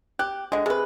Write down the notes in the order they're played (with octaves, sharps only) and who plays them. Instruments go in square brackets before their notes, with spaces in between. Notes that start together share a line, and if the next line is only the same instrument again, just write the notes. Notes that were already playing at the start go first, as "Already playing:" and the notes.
[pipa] G4 [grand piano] F#6
[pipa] D3 G#3 [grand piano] D#5
[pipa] C3 B4 [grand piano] G#4